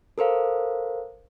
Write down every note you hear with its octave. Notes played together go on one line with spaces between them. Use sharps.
A4 A#4 C5 F5